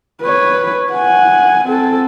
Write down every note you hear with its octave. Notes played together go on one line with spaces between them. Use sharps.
B4 C#5
F#5 G#5
C4 A4